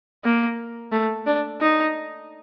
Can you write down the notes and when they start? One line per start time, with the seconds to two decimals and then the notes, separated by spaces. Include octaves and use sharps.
0.24 A#3
0.92 A3
1.26 D4
1.61 D#4